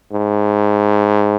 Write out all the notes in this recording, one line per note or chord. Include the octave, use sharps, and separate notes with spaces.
G#2